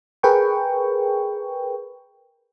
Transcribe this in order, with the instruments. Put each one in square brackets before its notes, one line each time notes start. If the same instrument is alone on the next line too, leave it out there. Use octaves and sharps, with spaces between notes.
[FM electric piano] G#4 A#4 B4 G5 C#6